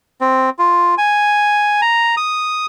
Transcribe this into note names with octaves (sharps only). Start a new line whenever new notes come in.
C4
F4
G#5
A#5
D#6